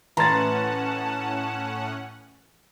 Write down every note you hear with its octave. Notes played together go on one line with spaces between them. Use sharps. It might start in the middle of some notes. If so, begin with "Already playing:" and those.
A2 E3 C#4 F#5 A5 A#5 C6 A6